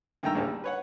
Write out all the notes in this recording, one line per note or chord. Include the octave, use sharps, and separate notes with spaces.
G2 D#3 A3 G5 A#5 E6
A1 D2 C#3 A#3 A5
G3
B4 C#5 F#5